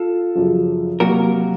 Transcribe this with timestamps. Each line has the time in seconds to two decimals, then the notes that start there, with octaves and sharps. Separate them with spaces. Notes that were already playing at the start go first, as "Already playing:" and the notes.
Already playing: F4 A4
0.35 F#2 C#3 F3
1.00 C3 F#3 A#3 F#4 A#4